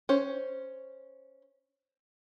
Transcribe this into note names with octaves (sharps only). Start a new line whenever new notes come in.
C#4 C5